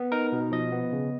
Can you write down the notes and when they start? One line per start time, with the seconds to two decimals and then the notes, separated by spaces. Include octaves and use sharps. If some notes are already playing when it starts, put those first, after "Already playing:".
Already playing: B3
0.12 D#4 A#4
0.32 B2
0.52 F3 D#5
0.72 B3
0.92 C#3